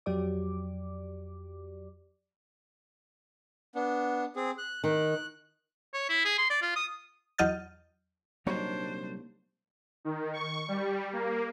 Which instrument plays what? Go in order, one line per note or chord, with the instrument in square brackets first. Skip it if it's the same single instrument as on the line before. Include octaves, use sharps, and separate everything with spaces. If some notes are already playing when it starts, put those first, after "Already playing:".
[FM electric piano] F2 F#3 G4 D5 D6
[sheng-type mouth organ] B3 D4
C4 G#4
F#6
[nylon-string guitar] D#3 [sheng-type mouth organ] F#6
[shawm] C#5
E4
G#4
C6
D5
F4
D#6
[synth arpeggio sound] E2 F#3 D#5 F6 G6 A6
[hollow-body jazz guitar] C2 D#4 C#5 [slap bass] F#3 G3 [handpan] A#3 [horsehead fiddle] D4 C5
[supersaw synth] D#3
C#6
G3
A#3